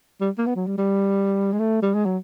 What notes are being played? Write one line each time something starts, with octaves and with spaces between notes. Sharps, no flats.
G3
A#3
B3
F#3
G3
G3
G#3
A3
G3
G#3
F#3